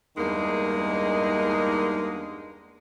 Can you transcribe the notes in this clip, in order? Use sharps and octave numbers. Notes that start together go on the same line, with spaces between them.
E2 G2 D#3 G#3 A#3 D#4